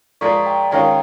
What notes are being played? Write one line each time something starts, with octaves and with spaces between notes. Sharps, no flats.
A#2 F3 G#3 A#5 C#6
G5 A#5
D#3 G#3 C#4 F4 G5 A#5